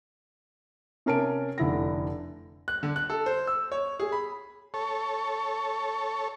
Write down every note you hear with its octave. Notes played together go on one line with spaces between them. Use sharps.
C3 C#4 A#4 A5 D7
F1 D3 E4 A#6
F#6
D3
F#6
A4
C5
E6
C#5
G#4
B5
A4 C#5